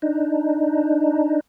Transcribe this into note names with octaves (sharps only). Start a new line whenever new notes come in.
D4 D#4